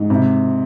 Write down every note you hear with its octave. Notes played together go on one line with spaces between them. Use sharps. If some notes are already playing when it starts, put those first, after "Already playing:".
Already playing: G#2
C3